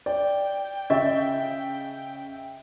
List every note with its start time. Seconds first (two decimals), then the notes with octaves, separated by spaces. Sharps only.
0.06 D5 G5
0.90 C#3 D#5 E5 C#6